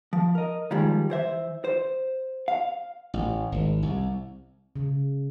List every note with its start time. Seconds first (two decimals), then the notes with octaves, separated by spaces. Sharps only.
0.13 F3
0.35 A#4 D#5
0.71 D#3 F3 G3 G#3
1.10 E3 C5 E5
1.64 C5
2.48 F5
3.14 A1
3.52 G#1
3.83 C2
4.76 C#3